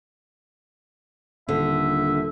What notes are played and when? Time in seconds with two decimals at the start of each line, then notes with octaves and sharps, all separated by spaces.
1.49 D#1 D3 E5